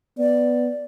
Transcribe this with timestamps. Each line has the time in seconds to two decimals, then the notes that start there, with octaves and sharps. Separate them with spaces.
0.18 B3 D5